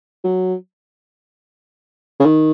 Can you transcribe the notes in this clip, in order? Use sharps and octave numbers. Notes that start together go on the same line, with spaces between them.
F#3
C#3
D#3